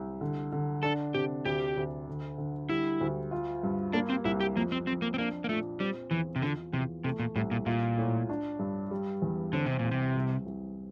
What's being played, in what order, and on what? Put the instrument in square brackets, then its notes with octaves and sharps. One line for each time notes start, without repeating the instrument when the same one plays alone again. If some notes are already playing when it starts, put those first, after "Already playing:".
Already playing: [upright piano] C2
D3
D3
[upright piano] D4 [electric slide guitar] A4
[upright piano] C3 [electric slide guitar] G4
[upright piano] D2 [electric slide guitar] G4
[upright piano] D2
D3
D3
[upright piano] G3 [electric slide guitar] E4
[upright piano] D2
F4
G2
[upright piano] A#3 [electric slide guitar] D4
[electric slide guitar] C4
[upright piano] C2 [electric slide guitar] E4
[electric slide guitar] G4
[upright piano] F2 [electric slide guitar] A#3
[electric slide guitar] C4
[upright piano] F2 [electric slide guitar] C4
[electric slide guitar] A#3
C4
[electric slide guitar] A#3 [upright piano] D4
[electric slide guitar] A#3
[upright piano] A#2 [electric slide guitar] A3
[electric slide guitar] G3 [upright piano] C4
[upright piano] E2 [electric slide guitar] E3
[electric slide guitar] C3
[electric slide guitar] D3 [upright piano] F4
[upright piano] E2 [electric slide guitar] C3
[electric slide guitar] C3 [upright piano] A3
[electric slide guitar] A#2
[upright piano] C2 [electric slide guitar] A2
[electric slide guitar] A#2
[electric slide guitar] A#2 [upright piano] F4
[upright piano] A2
D4
G2
G3
E2
[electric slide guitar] D3 [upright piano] C4
[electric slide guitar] C3
A#2
[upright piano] C2
[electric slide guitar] C3
[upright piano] C2
C2